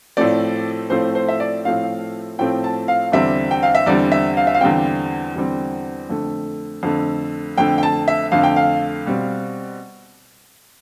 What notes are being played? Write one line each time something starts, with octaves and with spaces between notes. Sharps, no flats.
A2 F3 A3 C4 D5
A2 F3 A3 C4 C5
C5
E5
D5
A2 F3 A3 C4 F5
A2 F3 A3 C4 G5
A5
F5
E2 D3 G3 C4 E5
G5
F5
E5
E2 D3 G3 C4 D5
E5
F5
E5
F5
E2 D3 G3 C4 G5
E2 D3 G3 C4
F2 D3 A3
F2 D3 A3
F2 D3 A3 G5
G5
A5
E5
F2 D3 A3 F5
G5
F5
B2 G3 C4